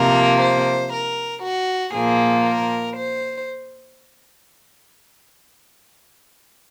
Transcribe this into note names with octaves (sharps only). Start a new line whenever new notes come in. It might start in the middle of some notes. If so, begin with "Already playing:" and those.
Already playing: C3 F3 A#3 A#4
C5
A#4
F#4
A#2 F3 A#3 G#4
A#4
C5